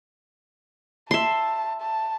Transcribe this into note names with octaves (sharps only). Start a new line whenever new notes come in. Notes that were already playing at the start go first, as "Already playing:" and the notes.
E5 A5 C6
A5